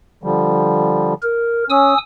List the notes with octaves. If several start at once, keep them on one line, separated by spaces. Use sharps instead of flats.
D3 F3 G3
A#4
C#4 G#5 D#6 E6